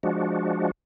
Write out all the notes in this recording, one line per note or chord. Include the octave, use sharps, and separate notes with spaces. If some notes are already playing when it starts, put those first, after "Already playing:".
F3 G#3 D4 F#4